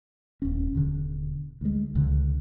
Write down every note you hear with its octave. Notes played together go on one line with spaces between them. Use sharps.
D#1 C#4
D#1 B2 D3
D2 G#3
C#2 B2 D3